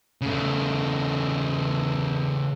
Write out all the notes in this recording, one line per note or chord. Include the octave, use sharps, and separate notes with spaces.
C#3 A3